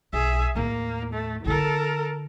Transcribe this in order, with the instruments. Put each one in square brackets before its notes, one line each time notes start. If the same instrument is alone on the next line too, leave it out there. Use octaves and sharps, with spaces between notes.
[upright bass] B1 [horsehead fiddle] G#4 E5
[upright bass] D#2 A2 [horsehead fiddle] A#3
[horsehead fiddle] A3
[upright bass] D3 E4 [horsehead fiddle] A4 A#4